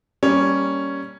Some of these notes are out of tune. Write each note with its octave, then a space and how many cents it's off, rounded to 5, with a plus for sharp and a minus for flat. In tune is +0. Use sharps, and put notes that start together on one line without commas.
G3 +0 A#3 +0 C#4 +0